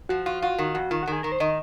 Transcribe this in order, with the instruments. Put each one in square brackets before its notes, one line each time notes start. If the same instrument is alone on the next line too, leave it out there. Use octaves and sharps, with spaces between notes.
[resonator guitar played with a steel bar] F3 [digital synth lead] F#4
[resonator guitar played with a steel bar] F4 [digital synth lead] F#4
[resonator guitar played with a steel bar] F4 [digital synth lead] F#4
[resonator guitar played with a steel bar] D#3 [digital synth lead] F#4
[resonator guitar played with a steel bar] F2 [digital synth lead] F#4
[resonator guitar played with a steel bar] D#3 [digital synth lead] F4
[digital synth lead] F#4
[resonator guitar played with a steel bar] D#3 [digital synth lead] G#4
[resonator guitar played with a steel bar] D#3 [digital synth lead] A#4
[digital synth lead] C5
[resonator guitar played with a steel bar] D#3 [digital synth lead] D#5